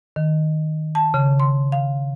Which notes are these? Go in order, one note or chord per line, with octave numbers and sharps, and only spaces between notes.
D#3
A5
C#3
C6
F5